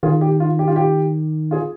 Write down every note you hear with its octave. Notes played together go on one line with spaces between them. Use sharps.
D#3 F4 G#4
G4
F4
G4
F4
G4
F4 G#4